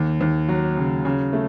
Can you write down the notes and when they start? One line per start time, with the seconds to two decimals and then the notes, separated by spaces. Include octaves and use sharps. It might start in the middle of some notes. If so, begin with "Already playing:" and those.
Already playing: D#2
0.21 D#2
0.49 F#3
0.77 C#3
1.05 C#3
1.33 A3